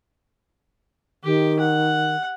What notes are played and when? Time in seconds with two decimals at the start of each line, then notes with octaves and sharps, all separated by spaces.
1.24 D#3 G4
1.59 F#5